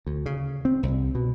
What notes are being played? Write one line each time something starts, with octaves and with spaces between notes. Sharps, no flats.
D2
C#3
C4
C2
B2